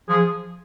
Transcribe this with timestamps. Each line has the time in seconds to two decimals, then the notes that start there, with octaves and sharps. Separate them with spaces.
0.09 F3 G#4